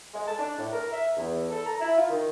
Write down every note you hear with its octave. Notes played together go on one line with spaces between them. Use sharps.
G#3
A5
D4
A2
A#4
E5
E2
A4
A#5
E4
F4
D#3